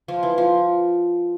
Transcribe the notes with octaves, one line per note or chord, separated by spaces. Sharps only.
F3 F4
E3 E4
F3 F4